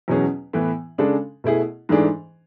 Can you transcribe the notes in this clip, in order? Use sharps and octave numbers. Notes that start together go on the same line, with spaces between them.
E2 B2 F#3 C#4 G#4
A2 E3 B3
C#3 G#3 D4 A4
B2 A3 E4 G#4
G#2 E3 A3 D4 G#4